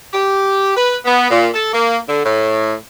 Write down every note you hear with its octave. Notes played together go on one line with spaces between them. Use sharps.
G4
B4
B3
A#2
A4
A#3
D3
A2